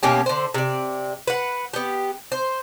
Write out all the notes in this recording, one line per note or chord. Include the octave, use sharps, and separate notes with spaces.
B2 A#3 C#4 G4
D3 C5
C3 D5
B4 F#5
B3 G4
C5